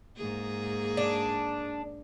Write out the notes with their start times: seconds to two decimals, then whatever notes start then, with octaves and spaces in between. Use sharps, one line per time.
0.17 G#2 A#3 G#4
0.97 D4